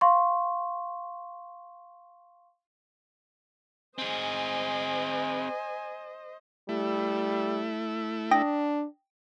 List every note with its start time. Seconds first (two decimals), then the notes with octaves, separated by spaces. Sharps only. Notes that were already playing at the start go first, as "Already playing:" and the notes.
0.01 F5 C6 C#6
3.98 C4 G#4 C5 D#5 G#5
6.69 G3 A3 E4
8.31 D4 G5 D#6 A#6